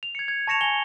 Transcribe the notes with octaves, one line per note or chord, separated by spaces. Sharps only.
F7
G#6 C#7
G#6
A5 C#6 A#6 C#7 E7 F7
G#5 F7 G7